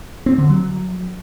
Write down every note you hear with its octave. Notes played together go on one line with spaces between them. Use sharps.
C4
D3
F#3